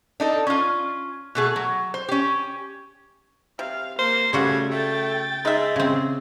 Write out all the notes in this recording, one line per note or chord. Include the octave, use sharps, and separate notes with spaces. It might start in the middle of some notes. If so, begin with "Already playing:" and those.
D4 D#4 A4
C#4 F4
B2 A3 G#4
F#3
C5
C#4 G4
C3 F5
A#3 C5
C#3 G3 A3 F#4 F#5 G#6
A3 G5 A6
G#3 D#4 E5
C#3 C4